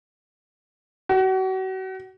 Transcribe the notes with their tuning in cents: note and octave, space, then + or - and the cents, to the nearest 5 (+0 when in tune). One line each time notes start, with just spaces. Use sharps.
F#4 +35